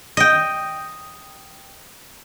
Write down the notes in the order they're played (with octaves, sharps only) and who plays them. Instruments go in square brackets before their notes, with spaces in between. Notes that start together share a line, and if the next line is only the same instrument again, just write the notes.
[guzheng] D#5 G5